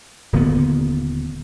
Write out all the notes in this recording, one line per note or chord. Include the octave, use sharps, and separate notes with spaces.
D#1 D3 A#3 B3